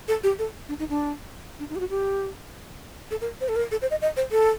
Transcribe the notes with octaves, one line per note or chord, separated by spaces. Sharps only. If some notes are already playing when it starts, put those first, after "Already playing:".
A4
G4
A4
D4
D#4
D4
D4
D#4
G4
F#4
G4
A4
A#4
C5
A4
A#4
A4
C5
D#5
D#5
C5
A4